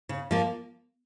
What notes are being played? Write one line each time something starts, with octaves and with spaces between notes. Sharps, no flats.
C#3
F3 A#3